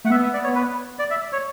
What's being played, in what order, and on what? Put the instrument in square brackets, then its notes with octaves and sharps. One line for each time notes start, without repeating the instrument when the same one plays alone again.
[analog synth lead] A3 [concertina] F#5
[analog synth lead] B3 [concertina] E5
[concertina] E5
D5
C#5
B4
D5
E5
C#5